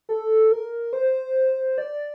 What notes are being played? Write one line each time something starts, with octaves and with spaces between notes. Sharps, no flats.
A4
A#4
C5
D5